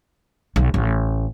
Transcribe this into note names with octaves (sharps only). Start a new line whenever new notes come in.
B1
A1